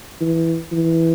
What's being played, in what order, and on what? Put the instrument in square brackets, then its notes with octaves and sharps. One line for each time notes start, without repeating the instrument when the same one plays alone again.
[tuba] E3
E3